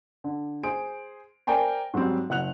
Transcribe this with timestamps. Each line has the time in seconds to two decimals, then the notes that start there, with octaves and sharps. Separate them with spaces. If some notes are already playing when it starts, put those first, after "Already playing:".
0.24 D3
0.63 G#4 C5 D7
1.47 A#4 C5 D5 G5 G#5 A#5
1.94 G#2 F#3 G3 C4
2.30 F#1 F#5 F#6 F7